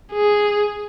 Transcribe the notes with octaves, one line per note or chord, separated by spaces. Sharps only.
G#4